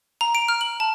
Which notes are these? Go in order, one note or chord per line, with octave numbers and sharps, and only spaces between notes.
A#5
D7
F6
F#7
A5